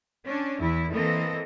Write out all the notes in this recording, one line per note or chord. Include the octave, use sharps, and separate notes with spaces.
C#4 D4
E2 E3 E4
E3 A#3 C4 A4 D#5